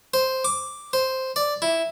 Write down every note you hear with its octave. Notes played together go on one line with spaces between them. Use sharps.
C5
D6
C5
D5
E4